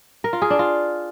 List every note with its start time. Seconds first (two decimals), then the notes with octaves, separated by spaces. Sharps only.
0.24 A#4
0.33 F4
0.42 G#4
0.50 D4
0.59 F4